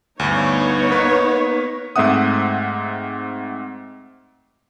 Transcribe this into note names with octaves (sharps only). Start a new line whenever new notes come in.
D2 G2 B3 D#4 C#5
A#3 A#4 B4
G#2 A3 C4 E5 F#5 D#6